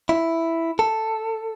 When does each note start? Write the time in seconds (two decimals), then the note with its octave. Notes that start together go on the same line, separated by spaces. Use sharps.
0.09 E4
0.79 A4